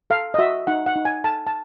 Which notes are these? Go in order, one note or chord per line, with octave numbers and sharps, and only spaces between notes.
A4 F5
D#5
F#4 E5
D#4 F#5
F#5
D#4
G#5
A4 A5
A5